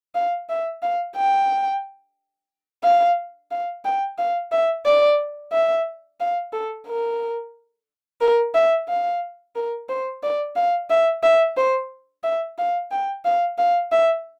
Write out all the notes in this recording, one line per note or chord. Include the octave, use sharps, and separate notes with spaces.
F5
E5
F5
G5
F5
F5
G5
F5
E5
D5
E5
F5
A4
A#4
A#4
E5
F5
A#4
C5
D5
F5
E5
E5
C5
E5
F5
G5
F5
F5
E5